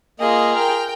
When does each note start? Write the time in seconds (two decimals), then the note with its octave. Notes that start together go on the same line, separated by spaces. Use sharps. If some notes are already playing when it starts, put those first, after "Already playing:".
0.20 A#3 F4 G#4 D#5
0.56 A#4 G5 F6